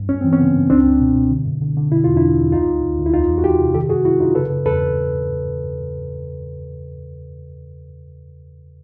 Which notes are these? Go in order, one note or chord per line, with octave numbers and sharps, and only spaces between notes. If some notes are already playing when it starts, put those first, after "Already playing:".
Already playing: G2
F#2 C#4
E3 C4
B3 C#4
C#3
F#2
C#2 C4 D4
C#2
B2
B2
D3
F#2
D3
D3
B2 E4
E2 F4
D4 E4
E2
E2
D2 D#4 F4
D2
D2
D2
E4
E2 D#4 F4
E2
F#4
E2 F4 G4
C3
D#3 G4 A4
F#2 F#4 G#4
F#2 E4 F#4
F#2 D#4 F4
C#3 A4 B4
C#3
E2 A4 B4